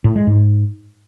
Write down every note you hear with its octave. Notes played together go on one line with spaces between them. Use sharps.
A2
G#3
G#2